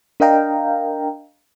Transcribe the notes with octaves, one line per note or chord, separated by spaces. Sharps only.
D4 A#4 D#5 F5 G5 A#5